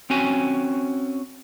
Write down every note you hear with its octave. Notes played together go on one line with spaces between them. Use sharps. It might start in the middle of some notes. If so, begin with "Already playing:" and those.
C4 C#4 F#4 G#5